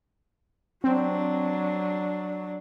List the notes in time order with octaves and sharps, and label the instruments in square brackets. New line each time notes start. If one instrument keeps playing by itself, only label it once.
[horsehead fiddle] F#3 D4 [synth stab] C4